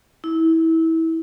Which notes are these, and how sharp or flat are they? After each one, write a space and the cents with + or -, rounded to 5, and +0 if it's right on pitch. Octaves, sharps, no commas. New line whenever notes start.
E4 -25